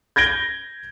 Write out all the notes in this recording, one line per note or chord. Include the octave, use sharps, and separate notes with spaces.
G6 G#6 A#6 D7 G7